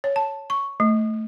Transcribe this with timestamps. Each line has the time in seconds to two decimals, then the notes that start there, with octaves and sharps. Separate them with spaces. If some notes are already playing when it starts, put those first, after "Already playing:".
0.04 C#5
0.16 A5
0.50 C#6
0.80 A3